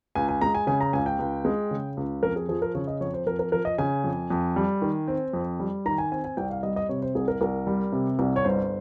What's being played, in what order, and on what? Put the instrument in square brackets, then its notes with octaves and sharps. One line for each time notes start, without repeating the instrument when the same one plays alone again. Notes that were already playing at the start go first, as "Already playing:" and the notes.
[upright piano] C#2 G#5
G#5
G#3 A#5
G#5
C#3 G#5
A#5
C#2 G#5
G5
C#2
G#3
C#3
C#2
F2 A#4
G#4
F3 G#4
A#4
C#3 C#5
D#5
F2 C#5
C5
F2 A#4
A#4
F3 A#4
D#5
C#3 G#5
F2
F2
G3
D#3
C4
F2
G3
D#3 A#5
G#5
C4 G#5
G#5
C2 G5
F5
G3 D#5
D#5
C3 C#5
C5
C2 G#4
A#4
C2 A#4
G3
C3
C2
C#5
G1 C5